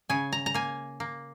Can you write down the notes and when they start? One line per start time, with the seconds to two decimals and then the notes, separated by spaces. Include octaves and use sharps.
0.10 C#3 G#5
0.32 A#5
0.46 A#5
0.54 A#3 G#5
1.00 A#3